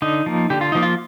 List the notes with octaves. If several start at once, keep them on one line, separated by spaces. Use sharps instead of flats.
D3 D#4
F3 A#3
D3 G4
F4
F3 A#3 D#4
F4